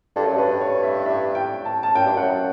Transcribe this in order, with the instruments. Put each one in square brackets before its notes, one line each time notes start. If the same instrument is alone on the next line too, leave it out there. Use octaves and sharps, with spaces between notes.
[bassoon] G2 [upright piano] A4
[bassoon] F#2
[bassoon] G2 [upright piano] B4
[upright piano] C#5
E5
E5
G5
A5
A5
[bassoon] F#2 [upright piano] G5
[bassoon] G2
[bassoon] F#2 [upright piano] F#5